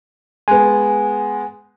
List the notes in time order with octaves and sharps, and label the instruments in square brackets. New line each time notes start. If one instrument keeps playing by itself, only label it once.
[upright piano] G#3 B3 [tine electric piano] G#5